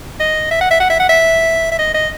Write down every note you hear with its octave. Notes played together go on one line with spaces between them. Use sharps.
D#5
E5
F#5
E5
F#5
E5
F#5
E5
E5
D#5
D#5